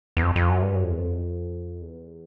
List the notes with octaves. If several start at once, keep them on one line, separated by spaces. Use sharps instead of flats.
E2
F2
F2
F#2
G2
F#2
F2
E2
F2
E2